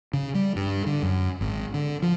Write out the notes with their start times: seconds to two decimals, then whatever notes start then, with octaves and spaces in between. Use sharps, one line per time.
0.13 C#3
0.34 G3
0.56 G2
0.86 D3
1.03 F#2
1.41 G#1
1.74 D3
2.02 F3